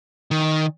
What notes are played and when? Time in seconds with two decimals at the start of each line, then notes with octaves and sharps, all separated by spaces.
0.31 D#3